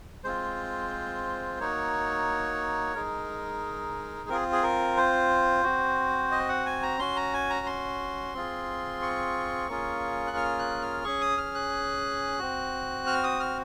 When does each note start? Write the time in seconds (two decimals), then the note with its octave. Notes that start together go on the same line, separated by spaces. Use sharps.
0.24 G#3 C4 F4 C5
1.60 A#3 D#4 F#4 C#5
2.94 G#3 D#4 G#4 A#4
4.29 C4 F4 G#4 A#4
4.52 G#4
4.63 A#4
4.97 C5
5.64 C4 F#4
6.32 D#5
6.49 F#5
6.66 G#5
6.82 A#5
6.99 C#4 F#4 C6
7.16 A#5
7.33 G#5
7.50 A#5
7.66 C6
8.34 C4 F4 G#4
9.02 C#6
9.69 A#3 C#4 F4 G#4
10.27 F#6
10.37 F6
10.59 F#6
10.82 F6
11.04 C#4 G#4 C#6
11.21 D#6
11.38 F6
11.55 F#6
12.39 C4 F#4
13.07 F6
13.24 D#6
13.40 F6